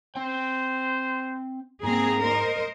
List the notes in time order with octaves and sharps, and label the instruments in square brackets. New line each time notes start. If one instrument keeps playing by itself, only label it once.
[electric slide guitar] C4 G5 [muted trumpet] C5
[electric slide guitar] G#2 G#3 [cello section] A#3 C4 G#4 [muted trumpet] A#5
[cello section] A#4 C5 D#5